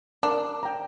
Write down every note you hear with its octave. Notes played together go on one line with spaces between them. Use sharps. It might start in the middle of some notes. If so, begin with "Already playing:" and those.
D4 A#4
G5 A#5